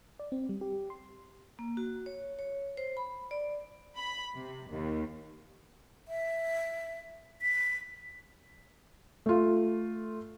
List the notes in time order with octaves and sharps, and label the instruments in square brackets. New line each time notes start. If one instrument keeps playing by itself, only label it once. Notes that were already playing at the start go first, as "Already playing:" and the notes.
[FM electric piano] D5
C4
G3
G4
C6
[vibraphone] A#3
F#4
C#5
C#5
C5
B5
D5
[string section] B5
C3
D#2
[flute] E5
B6
[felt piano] A3 F4